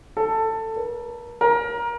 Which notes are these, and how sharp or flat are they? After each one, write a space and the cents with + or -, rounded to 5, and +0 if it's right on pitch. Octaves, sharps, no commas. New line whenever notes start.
A4 +15
A#4 +45
A#4 +20